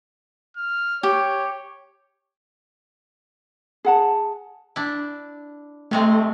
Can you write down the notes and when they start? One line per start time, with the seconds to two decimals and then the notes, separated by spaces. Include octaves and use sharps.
0.57 F6
1.03 G4 C#5
3.85 G#4 F#5 A5
4.76 D4 E4
5.91 C3 G#3 A3 C4